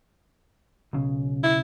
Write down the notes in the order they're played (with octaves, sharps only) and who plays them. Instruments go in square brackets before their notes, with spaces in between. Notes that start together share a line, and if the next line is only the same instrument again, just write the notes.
[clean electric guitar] B1 C#3
[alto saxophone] E4